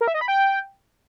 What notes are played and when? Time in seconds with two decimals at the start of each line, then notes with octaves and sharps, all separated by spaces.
0.01 A#4
0.08 E5
0.14 D#5
0.21 B5
0.28 G5